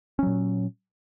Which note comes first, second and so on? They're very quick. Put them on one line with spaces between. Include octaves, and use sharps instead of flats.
C#4 F#3 A#2